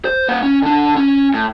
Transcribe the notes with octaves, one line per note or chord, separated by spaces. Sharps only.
C5
A#3 F#5
C#4
D3 D4
C#4
A2